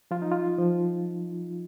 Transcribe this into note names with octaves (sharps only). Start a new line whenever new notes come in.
F3 F4
D#4
F4
F3